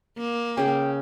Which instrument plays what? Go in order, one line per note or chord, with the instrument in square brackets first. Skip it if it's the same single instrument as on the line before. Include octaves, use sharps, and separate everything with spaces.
[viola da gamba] A#3
[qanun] C#3 G#4 [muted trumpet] G5